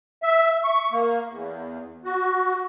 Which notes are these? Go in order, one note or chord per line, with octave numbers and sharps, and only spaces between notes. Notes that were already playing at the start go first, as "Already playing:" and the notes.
E5
C#6
A#3
E2
F#4